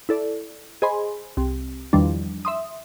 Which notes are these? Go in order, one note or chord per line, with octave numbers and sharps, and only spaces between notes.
E4 A4 D5
G#4 C5 D#5 G#5 B5 C6
C2
E2 D#3 F3 G3 D4
E5 C6 D#6